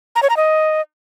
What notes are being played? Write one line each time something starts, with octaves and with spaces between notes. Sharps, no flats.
A#5
C#5
A#5
D#5